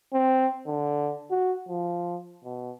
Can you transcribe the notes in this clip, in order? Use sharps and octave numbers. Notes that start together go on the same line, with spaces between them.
C4
D3
F#4
F3
B2